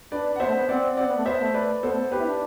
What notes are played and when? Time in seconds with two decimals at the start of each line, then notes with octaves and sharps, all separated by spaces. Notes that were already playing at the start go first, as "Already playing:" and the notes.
0.11 D4 B4 D5
0.36 F#5
0.40 B3 C5 E5
0.47 A3
0.55 B3
0.68 C4 D5 F#5
0.97 C4 D5 F#5
1.07 B3
1.17 A3
1.26 B3 C5 E5
1.40 A3
1.54 B4 D5
1.83 B3 A4 C5
1.92 A3
2.01 B3
2.12 G4 B4
2.18 E4
2.26 D4